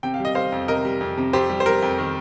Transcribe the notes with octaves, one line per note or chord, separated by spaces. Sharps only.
C3 G5
F5
G3 D#5
G3 C5 F5
F2
C3 A#4 D#5
G3
F2
C3
F2 G4 C5
G3
C5
G3 A#4
F2
D#3